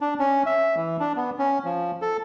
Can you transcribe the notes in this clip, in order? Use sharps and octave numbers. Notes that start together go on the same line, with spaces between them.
D4
C#4
E5
E3
D4
B3
C#4
F3
A4